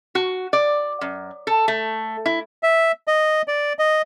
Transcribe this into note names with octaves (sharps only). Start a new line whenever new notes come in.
F#4
D5
F#2
A4
A3
E4
E5
D#5
D5
D#5